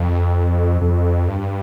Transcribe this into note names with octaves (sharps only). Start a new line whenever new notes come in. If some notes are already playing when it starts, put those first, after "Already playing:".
Already playing: F2
F2
G2